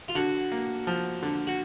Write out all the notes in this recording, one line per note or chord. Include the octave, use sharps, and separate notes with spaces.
F4
D3 F#4
A#3
F3
D3
F#4